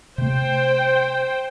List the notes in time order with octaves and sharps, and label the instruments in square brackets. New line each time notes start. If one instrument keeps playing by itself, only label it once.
[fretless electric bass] C3 A3 [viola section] C5 G5